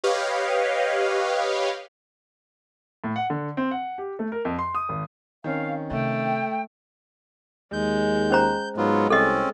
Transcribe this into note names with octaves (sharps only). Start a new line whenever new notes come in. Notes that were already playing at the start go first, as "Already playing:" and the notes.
G4 B4 C#5 D#5 F5
A2
F#5
D3
C4
F#5
G4
A3
A#4
F2
C6
D#6
G#1
D#3 C4 C#4 F5
C3 A3 G5
D#2 G#3 G6
C#4 C5 A#5
G#2 F#3 G#3 B3 F4
C2 C4 C#4 A4 D#5